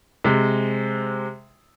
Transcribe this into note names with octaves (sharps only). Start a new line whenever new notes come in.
C3 G#3